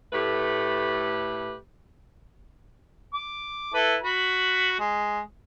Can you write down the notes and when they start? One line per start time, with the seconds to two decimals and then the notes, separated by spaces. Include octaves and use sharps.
0.13 A2 A3 G4 B4 B5
3.14 D6
3.74 E4 A4 B4
4.03 F#4 B5
4.79 G#3